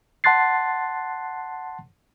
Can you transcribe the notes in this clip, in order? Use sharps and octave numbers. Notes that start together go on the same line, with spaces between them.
F#5 A5 C6 F#6 A6 C7